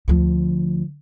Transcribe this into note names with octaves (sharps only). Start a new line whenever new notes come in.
D2 F3